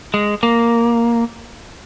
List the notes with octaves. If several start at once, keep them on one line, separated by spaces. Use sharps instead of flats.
G#3
A#3